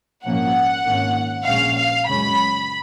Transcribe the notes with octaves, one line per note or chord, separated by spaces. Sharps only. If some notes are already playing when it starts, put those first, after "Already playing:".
A#1 G#2 F3 A#3 C#4 F#5
G#1 G#2 D#3 A#3 C#4
A#1 A#2 G#3 C#4 F5
F5
F#2 C#3 G#3 C#4 B5